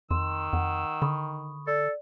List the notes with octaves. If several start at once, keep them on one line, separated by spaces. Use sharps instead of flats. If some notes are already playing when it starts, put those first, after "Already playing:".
F2 D#3 C6 E6
F2 F#5
D3 B5 C#6 D#6
A4 D5